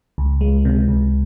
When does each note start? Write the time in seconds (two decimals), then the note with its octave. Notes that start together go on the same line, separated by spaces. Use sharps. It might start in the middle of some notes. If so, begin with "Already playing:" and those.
0.18 C#2
0.41 G#3
0.65 C3
0.88 C#2